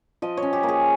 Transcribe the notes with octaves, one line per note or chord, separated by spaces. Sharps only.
F3 D#5
C#5
C#4
G4
A#3
G#4